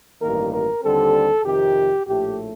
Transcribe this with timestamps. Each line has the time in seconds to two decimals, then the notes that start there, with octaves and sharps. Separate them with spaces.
0.21 A1 G2 D#3 A#3 A#4
0.52 A#4
0.83 D#2 D3 G3 C4 A4
1.44 F2 C3 D#3 G4
2.06 A#1 A2 A3 G4